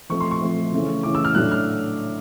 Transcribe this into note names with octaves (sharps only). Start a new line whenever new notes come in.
F3 A3 C4 C#6
C6
C#6
F3 A3 C4
C#3 E3 A3 C#4
C#3 E3 A3 C#4 D6
E6
F6
A2 F#3 A3 D4 F#6
F6